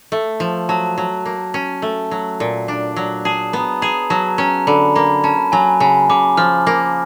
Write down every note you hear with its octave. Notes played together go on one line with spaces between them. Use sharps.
A3
F3
F#3 A5
F#3
A#3
C#4
A3
F#3
A#2
D4
F#3
G#4 A5
B3 A#5
G#4 A#5
F#3 A5
C#4 A#5
D3 B5
A#3 A#5
C#4 A5
F#3 G#5
C#3 G#5
C#3 D6
F3 F6
A#3